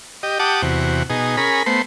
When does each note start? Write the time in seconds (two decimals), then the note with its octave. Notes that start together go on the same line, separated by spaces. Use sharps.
0.23 G4 D#5
0.39 G4 F#5 A5 D6 D#6
0.62 E2 C3 F#4
1.10 B2 D#4 G#4
1.37 C#4 G#4 A#4 B5
1.66 A3 B3 C5